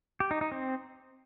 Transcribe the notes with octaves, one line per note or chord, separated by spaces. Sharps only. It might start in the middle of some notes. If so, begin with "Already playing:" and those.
G4
D#4
D#4
C4